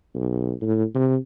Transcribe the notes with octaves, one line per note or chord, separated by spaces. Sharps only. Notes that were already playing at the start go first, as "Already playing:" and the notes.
B1
A2
C3